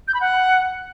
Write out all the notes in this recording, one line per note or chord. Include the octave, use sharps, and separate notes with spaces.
G6
B5
F#5